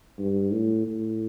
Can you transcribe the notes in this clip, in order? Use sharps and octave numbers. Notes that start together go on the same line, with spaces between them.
G2
A2
A2